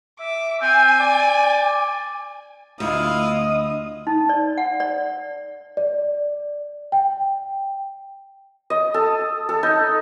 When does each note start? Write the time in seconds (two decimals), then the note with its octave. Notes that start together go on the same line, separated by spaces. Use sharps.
0.20 E5 D6
0.62 C4 G#5
1.00 D5
2.80 D2 E4 F4 D#5 F5 D#6
4.07 D#4
4.29 D5
4.58 F#5
4.80 D5
5.77 D5
6.92 G5
8.70 D#5
8.94 A4
9.49 A4
9.63 D#4